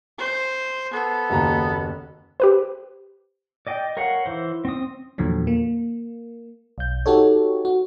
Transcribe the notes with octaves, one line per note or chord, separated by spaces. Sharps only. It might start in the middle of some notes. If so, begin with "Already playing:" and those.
C5
B3 A4
F#1 D#2 A#5
G4 B4 C5
D5 D#5 G5
A#4 C#5 F5 F#5
E3 C5
C4 D#6
E2 A#2 D3 F3 F#3
A#3
B1 G6
D#4 F#4 G4 A4 C#5
F#4